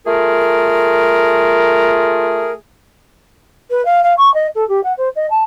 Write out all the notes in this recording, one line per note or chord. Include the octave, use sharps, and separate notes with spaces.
A3 F4 G#4 A#4
B4
F5
F5
C#6
D#5
A4
G4
F#5
C5
D#5
A5